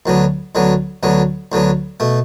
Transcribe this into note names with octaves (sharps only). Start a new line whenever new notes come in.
D2 D3 F#3 B3
D2 D3 F#3 B3
D2 D3 F#3 B3
D2 D3 F#3 B3
B2 A3